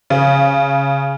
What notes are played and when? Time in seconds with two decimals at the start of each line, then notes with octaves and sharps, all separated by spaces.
0.10 C#3